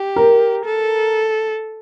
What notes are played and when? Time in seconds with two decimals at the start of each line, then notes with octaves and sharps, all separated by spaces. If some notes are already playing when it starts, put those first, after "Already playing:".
Already playing: G4
0.16 A#4
0.65 A4